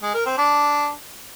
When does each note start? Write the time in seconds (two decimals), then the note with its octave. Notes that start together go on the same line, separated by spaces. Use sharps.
0.02 G#3
0.14 A#4
0.26 C4
0.38 D4